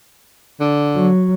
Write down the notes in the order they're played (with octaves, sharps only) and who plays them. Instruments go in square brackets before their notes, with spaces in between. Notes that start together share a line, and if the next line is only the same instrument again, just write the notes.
[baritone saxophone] D3
[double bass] F#3